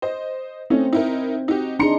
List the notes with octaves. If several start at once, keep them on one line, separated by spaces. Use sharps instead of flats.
C5 D#5
A3 C4 C#4 D#4
D#4 E4 A#4
D#4 F#4 G4
D4 D#4 G#4 A#5 C6 C#7